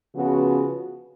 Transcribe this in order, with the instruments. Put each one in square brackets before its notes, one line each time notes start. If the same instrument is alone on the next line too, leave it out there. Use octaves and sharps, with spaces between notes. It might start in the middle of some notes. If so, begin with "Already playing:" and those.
[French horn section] C#3 F3 B3 F#4